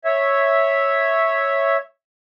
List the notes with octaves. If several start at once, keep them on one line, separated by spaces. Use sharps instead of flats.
C#5 E5